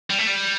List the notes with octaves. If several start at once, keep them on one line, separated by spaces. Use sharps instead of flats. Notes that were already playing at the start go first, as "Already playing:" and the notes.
G3
A3
G3